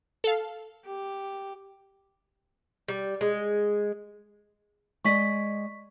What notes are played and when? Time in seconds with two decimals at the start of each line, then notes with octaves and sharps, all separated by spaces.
0.24 A4 F5
0.85 G4
2.88 G3
3.21 G#3
5.05 G#3 D5 D#5 C#6 B6